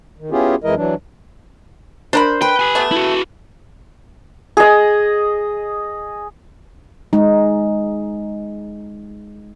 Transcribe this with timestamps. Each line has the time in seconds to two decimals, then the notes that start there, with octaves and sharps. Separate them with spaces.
0.19 D#3
0.31 B3 C#4 E4 F4 G4 G#4
0.64 F2 E3 G#3 E4 A#4 D#5
0.76 E3 F#3 D4
2.13 D4 A#4 C5 B5
2.42 B4 G5
2.60 G4 G#5
2.75 A3 B3
2.91 E4 F#4
4.57 G#4 D#5
7.13 G#3 D#4